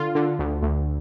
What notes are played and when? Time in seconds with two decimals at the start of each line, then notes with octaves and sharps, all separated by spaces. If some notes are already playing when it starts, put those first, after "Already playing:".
Already playing: D3 F4
0.15 D3
0.39 D2
0.62 D2